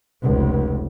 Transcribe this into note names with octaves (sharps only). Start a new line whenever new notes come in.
F1 C#2